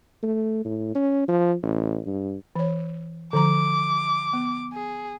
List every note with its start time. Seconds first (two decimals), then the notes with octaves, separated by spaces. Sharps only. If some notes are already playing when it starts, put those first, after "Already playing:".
0.23 A3
0.65 A2
0.95 C#4
1.28 F3
1.63 A1
2.06 G2
2.56 E3 C#5
3.33 D3 F3 A#5 D6
4.33 B3
4.73 G#4